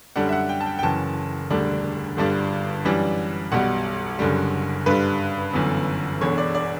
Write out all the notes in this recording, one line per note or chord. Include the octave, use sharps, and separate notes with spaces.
F#2 D3 G3 D4 F#5
E5
F#5
G5
A5
G5
G5
F#1 F#2 E3 A5
E1 D2 D3 G3 D4
G1 G2 D3 G3 D4
F#2 E3 G3 D4
B1 B2 G3 F#5
F#1 F#2 D3 G3
G2 D3 G3 B4
G1 F#2 E3 B3
E1 E2 D3 C#5
D5
D5